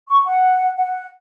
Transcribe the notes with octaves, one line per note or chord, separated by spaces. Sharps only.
C#6
F#5
F#5